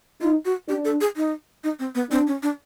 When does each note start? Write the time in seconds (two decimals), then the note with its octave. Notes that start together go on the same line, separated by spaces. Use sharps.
0.21 D#4 F4
0.45 F#4
0.68 D4 G4
0.85 A4
1.01 G#4
1.17 D#4
1.64 D#4
1.79 C4
1.95 B3
2.11 C4 D4
2.27 C#4
2.43 D4